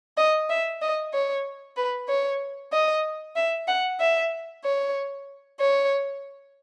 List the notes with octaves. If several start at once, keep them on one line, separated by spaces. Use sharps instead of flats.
D#5
E5
D#5
C#5
B4
C#5
D#5
E5
F#5
E5
C#5
C#5